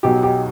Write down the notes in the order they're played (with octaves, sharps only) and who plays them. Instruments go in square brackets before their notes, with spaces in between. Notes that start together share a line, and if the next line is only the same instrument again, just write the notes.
[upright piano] B1 B2 F#3 [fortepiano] G4
[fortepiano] G4